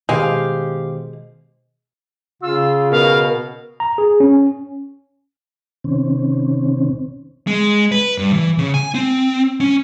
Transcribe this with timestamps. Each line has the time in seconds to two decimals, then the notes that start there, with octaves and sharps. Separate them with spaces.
0.09 B2 D#3 G#3 G4 C5 F5
2.42 C#3 F4 E6
2.92 B2 A#4 F5
3.80 A#5
3.98 G#4
4.20 C#4
5.84 C3 D#3 C4 C#4
7.47 G#3
7.92 B4
8.18 G2
8.33 E3
8.58 C#3
8.74 G#5
8.94 C4
9.60 C#4